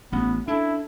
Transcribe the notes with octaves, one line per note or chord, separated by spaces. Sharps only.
A1 B3 C#4
D4 E4 A4